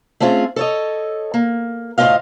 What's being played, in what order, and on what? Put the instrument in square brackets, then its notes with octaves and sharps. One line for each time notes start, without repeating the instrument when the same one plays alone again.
[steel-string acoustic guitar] A3 C4 C#4 F4 G#4
A4 C#5 D#5
A#3
D2 A2 D#4 F4 D#5 F5